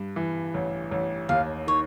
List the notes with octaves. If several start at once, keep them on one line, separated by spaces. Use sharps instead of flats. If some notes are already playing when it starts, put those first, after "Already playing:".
Already playing: G2
E3
A1
A1
D#2 F5
D#3 C#5